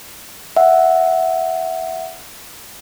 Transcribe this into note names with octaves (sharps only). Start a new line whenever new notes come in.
E5 F#5